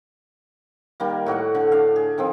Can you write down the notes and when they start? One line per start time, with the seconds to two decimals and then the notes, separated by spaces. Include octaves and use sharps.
1.00 D#3 G3 A#3
1.26 A2 F#4 D5 F#5
1.55 D3
1.72 D4 F5
1.96 G#4
2.18 D#3 F3 C4